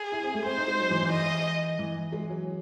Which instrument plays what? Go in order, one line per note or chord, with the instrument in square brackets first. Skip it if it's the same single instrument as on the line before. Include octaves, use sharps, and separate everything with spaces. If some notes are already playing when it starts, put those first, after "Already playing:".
Already playing: [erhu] G#4
[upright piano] E4
C4
A3
[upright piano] C4 [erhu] C5
[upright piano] D#4
G#3
F#3
E3
E3
[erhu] D#5
[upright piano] E3
G#3
F#3